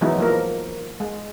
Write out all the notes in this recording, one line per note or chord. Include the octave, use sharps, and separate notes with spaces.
E3 F#3 G#3 B3 D#4 E4
F3 A#3 A#4
G#3